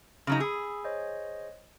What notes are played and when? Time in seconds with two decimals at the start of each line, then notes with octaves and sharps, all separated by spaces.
0.27 C#3 F#3 D#4
0.40 G#4 B5 D#6 E6
0.85 C5 C#5 D#5